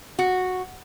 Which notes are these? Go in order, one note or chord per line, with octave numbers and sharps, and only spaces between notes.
F#4